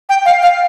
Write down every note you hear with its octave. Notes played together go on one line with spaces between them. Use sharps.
G5
F5
F5